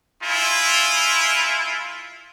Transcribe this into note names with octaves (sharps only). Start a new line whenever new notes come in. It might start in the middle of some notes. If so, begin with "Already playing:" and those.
G#3 E4 F4